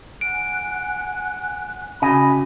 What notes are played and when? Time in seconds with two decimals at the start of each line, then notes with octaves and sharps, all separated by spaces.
0.21 F#5 G#5 F#6 D7
2.02 C#3 C#4 F#4 D#5 G#5 B5